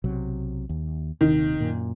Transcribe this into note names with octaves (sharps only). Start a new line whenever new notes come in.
B1 C3 F#3
D#2
D#1 D#2 C3 D#3
F#2 A#2